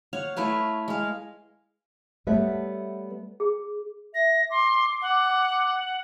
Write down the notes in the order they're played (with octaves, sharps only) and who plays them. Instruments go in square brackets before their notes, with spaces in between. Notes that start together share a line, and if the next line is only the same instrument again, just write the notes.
[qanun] C#5 F5 F#5
A3 E4 B4 F5
G#3 F5
[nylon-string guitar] G3 A3 B3 B4 C#5 E5
[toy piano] G#4
[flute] E5 [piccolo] A#6
[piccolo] C6 [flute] D6
[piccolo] F#5